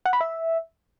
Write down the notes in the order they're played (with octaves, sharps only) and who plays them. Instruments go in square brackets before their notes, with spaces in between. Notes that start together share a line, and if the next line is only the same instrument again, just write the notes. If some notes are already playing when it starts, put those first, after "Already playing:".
[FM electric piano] F#5
B5
E5